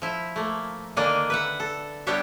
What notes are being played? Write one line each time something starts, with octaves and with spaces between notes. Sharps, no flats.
F3 E4
A3 A#3
D3 D#3 A#3 D4 D5 G#5
B4 E5 F#5
A4
G3 B3 D4 G4 C#5 E5